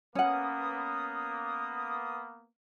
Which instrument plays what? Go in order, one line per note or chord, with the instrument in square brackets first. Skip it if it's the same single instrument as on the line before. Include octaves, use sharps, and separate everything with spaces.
[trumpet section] A#3 B3 [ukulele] C#4 F#5 [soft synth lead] D#6